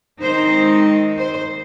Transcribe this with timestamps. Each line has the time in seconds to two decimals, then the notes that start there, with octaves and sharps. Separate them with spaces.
0.21 D#3 G#3 C4 D#4 C5
1.18 C5